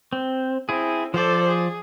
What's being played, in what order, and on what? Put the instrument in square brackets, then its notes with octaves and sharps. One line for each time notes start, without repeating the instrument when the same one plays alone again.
[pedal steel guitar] C4
[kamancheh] C4 [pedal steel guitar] E4 G#4
[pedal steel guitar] F3 D5 [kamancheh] A4 C5
[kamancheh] G#4